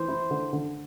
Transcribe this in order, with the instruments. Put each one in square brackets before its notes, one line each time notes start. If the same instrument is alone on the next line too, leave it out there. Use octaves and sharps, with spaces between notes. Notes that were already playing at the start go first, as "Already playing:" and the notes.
Already playing: [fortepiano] E3 [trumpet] C5
[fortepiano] E4
D3
D3